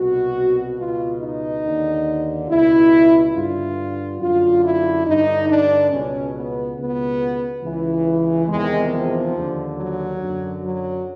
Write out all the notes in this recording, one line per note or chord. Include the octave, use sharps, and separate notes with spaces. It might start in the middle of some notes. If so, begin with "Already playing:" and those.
Already playing: C2 B2 F#4
C#2 B2 F4
D#4
D#2 D3
C#2 B2 E4
G2 D3 F4
F#2 D3 F4
E4
G2 D3 D#4
D4
C#2 B2 C#4
B3
C#2 B2 B3
C#2 C#3 E3
E2 C3 D#3 G#3
F3
D#2 D3
F#3
F#2 D3
F#3